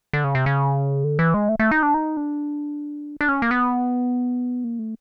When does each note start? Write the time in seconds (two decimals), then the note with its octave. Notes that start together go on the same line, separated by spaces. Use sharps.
0.13 D3
0.24 C#3
0.35 C3
0.46 C#3
1.04 D3
1.19 E3
1.34 G#3
1.49 A3
1.60 A3
1.71 D#4
1.83 D4
1.94 D#4
2.17 D4
3.21 D4
3.29 C#4
3.42 A#3
3.51 B3
4.64 A#3
4.79 A3